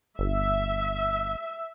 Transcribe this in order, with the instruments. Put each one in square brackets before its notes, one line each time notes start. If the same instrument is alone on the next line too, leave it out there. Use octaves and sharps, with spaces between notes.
[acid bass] G1 [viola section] E5